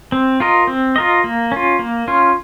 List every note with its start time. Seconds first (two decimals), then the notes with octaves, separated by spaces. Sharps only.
0.12 C4
0.40 F4 A#4 D#5
0.67 C4
0.96 F4 A#4 D#5
1.24 A#3
1.52 C#4 F4
1.79 A#3
2.08 C#4 F4